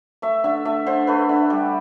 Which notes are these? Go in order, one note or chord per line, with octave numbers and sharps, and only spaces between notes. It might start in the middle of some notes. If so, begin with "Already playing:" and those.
A3 E5
D3 E5
A3 E5
D3 C5
A3 B4
D3
G3 G4